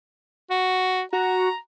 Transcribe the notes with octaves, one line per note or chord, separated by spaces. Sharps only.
F#4
F#4 A#5